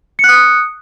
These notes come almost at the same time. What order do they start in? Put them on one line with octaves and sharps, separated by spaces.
C#7 F#6 D#6